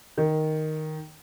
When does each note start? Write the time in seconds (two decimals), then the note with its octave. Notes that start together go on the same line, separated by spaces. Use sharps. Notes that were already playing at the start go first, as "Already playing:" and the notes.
0.18 D#3